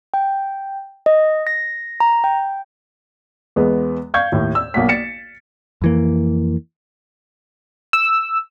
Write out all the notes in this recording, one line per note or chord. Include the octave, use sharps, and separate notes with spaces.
G5
D#5
A#6
A#5
G5
E2 G#3 B3
F5 C#6 G6 G#6
D#2 A2
E6
B1 A#3 F#5 B6
A6 C#7 E7
F2 E3 A#3
E6